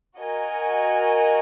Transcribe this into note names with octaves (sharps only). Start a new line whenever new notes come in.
F#4 A#4 D#5 G#5